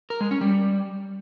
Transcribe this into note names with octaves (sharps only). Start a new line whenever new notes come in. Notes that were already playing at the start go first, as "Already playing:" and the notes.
A#4
G#3
C#4
G3